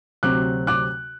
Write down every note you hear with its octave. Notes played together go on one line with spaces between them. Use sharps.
D2 C3 F#3 C4 D6 F#6
D6 F#6